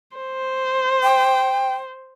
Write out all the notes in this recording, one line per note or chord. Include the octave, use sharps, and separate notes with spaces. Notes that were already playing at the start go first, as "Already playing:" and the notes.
C5
G5